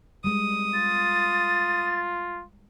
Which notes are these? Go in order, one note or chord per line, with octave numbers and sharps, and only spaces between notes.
G3 G#3 D#6
F4 A6